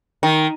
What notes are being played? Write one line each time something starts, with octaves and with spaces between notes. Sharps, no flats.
D#3